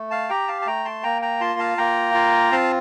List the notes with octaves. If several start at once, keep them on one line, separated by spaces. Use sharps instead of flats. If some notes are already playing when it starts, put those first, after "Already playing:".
Already playing: A3
F5 A5
G4 G5 A#5
F5 A5
A5
A3 G5 A#5
A5 C6
A#3 G5 A#5
G5 A#5
F4 A5 C6
F5 A5
A#3 G5 A#5
F4
C4 F5 A5